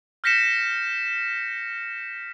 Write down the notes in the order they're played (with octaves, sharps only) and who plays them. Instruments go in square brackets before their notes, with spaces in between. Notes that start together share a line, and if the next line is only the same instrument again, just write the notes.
[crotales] F6 G6 A#6 B6 C#7 E7